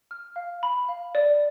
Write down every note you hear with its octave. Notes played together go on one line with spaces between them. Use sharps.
F6
F5
B5
F5
D5